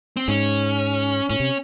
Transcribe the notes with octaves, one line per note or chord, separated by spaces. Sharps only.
C4
G#2 C#4
A2 C#4
C3